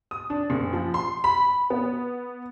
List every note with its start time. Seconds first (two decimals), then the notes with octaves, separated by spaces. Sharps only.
0.11 D#6
0.30 D4
0.50 F#1
0.73 F3
0.94 C6
1.24 B5
1.70 B3